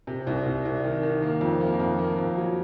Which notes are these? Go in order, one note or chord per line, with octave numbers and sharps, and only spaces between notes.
C3
C2
C2
C2
D#3
D#3
A#3
F2
A#3
F2
A#3
F2
F#3